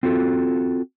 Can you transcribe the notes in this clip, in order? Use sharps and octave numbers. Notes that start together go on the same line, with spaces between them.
C4 F4 F#4 A4